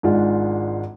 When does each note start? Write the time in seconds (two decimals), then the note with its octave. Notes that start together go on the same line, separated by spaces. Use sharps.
0.03 G#1 G#2 G#3 D4 F4